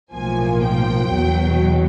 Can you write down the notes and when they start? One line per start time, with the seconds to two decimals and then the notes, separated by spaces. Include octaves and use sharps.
0.13 B1 A2 F3 A#3 G#5
0.63 G5
1.11 E2 B2 F#3